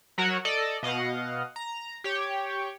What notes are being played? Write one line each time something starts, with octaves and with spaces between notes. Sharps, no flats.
F#3 F#4 A#4 C#5 F#5
A4 D5 D#5
B2 D#5 F5 F#5
A#5
G4 C#5 G5